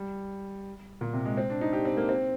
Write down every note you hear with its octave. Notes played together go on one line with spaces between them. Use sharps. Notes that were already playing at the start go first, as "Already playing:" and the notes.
Already playing: G3
A#2
C3
G#3
C4
D4
D#4
G4
C4
A#3
C4